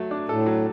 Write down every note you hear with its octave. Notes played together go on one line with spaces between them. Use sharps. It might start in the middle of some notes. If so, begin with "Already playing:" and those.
Already playing: F#3 A3
D4
A2 A4
F#3